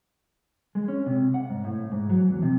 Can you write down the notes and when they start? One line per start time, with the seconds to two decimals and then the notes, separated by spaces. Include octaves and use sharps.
0.75 G#3
0.88 C#4
1.06 C3
1.34 F#5
1.50 G#2
1.64 A2
1.92 G#2
2.10 F#3
2.30 E2
2.42 C3